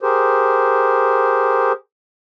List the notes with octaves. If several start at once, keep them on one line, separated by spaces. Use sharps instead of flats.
G4 G#4 A#4 C5